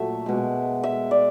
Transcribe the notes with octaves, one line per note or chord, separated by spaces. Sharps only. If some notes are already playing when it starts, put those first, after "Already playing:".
Already playing: A#2 F#3 A3 E5
B2 G#3
E5
D5